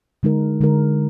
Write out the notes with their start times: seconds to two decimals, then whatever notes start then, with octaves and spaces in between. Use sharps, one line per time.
0.23 D3 G#3 D#4 A#4
0.61 D3 G#3 D#4 A#4